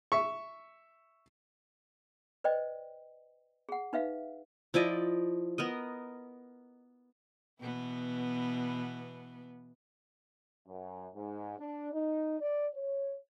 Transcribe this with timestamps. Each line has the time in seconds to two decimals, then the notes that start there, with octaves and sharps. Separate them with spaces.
0.12 E5 C#6
2.44 B4 C5 D5 D#5 G5
3.69 G#4 F#5
3.93 D#4 B4 E5 F5
4.74 F3 E4 D5 D#5
5.58 B3 A#4 D#5
7.61 B2 E3 B3
10.67 F#2
11.14 G#2
11.58 D4
11.93 D#4
12.40 D5
12.74 C#5